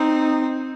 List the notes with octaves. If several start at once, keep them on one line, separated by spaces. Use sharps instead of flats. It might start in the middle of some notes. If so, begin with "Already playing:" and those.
Already playing: C4 D#4